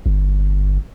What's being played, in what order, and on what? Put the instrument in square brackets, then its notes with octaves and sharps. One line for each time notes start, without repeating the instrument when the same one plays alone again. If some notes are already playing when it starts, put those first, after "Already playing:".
[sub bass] G1